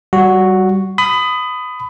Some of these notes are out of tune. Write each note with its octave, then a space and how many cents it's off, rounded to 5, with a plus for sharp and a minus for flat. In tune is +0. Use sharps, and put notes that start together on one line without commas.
G3 -25 F#4 +0
B5 +25 D#6 +0